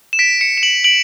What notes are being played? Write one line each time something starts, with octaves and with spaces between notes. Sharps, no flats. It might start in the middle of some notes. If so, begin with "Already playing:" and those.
E7
B6 D7
C#7 E7
E7
D7 F#7
D7 F#7